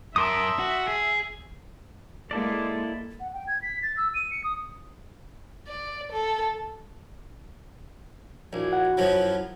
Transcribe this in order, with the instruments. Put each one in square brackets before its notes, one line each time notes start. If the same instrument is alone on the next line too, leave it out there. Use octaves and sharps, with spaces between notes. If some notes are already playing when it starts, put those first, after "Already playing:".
[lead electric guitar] F#2 A#4 [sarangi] E5 [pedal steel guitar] A5 C6 D#6
[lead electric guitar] F#4
G#4
[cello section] G#3 A#3 [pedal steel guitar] E4 A4 D5
[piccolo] F#5
G5
G#6
B6
A6
E6
D#7
C#7
D#6
[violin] D5
A4
[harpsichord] A#1 [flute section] E4 F#4 G#6
[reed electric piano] F#5
[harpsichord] F#2 F3 F#3